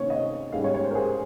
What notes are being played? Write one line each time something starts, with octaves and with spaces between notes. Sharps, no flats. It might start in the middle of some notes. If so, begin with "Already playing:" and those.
Already playing: C3 D#3 A#3 C#4 C5 C#5
D#5
G#2 G3 C#4 F5
C#5
C#5
C5
A#4
G#4